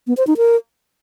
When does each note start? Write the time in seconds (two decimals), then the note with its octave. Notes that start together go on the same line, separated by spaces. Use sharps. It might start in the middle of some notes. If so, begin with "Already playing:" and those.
0.07 B3
0.17 C5
0.27 D#4
0.37 A#4